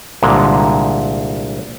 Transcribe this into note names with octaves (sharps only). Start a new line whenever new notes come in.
C2 A#2 D3 G#3